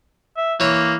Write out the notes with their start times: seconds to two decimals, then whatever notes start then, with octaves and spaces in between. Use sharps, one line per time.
0.37 E5
0.60 E3 A#3 C#5